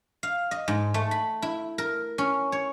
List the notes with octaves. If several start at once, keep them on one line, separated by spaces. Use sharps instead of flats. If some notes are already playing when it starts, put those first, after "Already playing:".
F5
D#5
G#2
A3
B5
E4
A#4
C#4
C#5